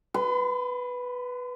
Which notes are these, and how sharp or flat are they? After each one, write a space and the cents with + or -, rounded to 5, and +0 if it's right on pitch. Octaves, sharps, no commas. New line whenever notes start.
B4 +0 C6 -45